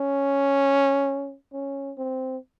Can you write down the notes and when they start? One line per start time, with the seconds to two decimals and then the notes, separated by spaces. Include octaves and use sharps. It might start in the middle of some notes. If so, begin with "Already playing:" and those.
Already playing: C#4
1.53 C#4
1.97 C4